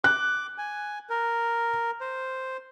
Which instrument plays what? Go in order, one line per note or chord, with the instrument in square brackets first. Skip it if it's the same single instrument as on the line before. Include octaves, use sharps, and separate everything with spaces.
[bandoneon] D6 [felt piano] F#6
[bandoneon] G#5
A#4
C5